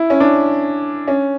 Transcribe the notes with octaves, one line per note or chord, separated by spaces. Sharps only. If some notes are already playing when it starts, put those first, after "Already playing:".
Already playing: E4
C#4
D4
C#4